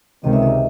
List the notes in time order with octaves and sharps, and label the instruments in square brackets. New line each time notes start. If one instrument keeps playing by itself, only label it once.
[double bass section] C#2 C3 D#3 [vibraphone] D#5
[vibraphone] E5
D#5